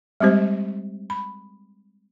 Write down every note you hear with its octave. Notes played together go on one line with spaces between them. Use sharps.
G3 G#3 C4 G4 C5
B5